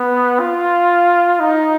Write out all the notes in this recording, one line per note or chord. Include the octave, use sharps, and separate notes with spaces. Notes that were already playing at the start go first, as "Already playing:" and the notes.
Already playing: B3
F4
D#4